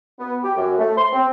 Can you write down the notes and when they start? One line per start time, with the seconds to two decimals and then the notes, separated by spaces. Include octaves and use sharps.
0.20 B3
0.43 G4
0.56 F#2
0.79 A3
0.96 C6
1.13 C4